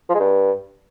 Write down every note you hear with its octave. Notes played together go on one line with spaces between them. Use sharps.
F3
G#3
G2